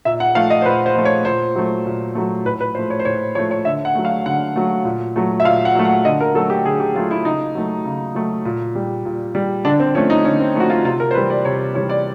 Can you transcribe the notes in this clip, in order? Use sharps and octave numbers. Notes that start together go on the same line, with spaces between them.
A#2 E5
F#5
F3 A3 F5
D#5
C5
A#2 B4
C5
F3 A3
C#5
A#2 C5
F#3 A3
A#2
F#3 A3
A2 B4
B4
F3 A3 C5
C#5
C5
A2 C#5
F3 A3 C#5
C#5
D3 E5
F#5
F#3 A3
F5
D3 F#5
F#3 A3
A#2
F#3 A3
E5
A#2 F5
F#5
F#3 A3
F#5
D3 D#5
A#4
F#3 A3 A4
G4
D3 G#4
G4
F#3 A3 F4
E4
C#3 D#4
F#3 A3
C#3
F#3 A3
A#2
G3
A#2
G3
D3 D4
C4
F3 A3 C#4
D#4
D3 C#4
C4
F3 A3 F#4
F4
C3 F4
A#4
C5
E3 G3 B4
D5
C3 C#5
E3 G3 C#5
D5